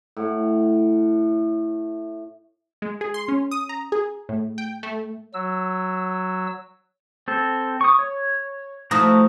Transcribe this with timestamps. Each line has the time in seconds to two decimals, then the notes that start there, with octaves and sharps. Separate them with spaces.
0.17 A2 F#5
2.82 G#3
3.01 G#4
3.14 C6
3.28 C#4
3.51 D#6
3.69 A#5
3.92 G#4
4.29 A2
4.58 G5
4.83 A3
5.34 F#3 E6
7.28 C4 A4
7.81 C#6 D#6
7.99 C#5
8.91 F3 A3 E4 F#4 A#5 D#6